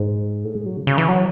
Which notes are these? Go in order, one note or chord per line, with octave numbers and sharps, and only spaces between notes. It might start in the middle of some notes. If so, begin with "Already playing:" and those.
Already playing: G#2
A2
G#3
F#3
C#3
C#3
E3
F#3